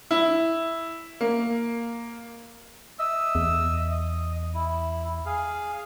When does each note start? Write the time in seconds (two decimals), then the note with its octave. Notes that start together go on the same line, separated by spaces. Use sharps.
0.11 E4
1.21 A#3
2.99 D#5 E5 E6
3.35 E2
3.92 D#5
4.54 E4
5.26 G#4 F5